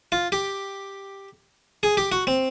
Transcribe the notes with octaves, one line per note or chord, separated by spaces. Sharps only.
F4
G4
G#4
G4
F#4
C4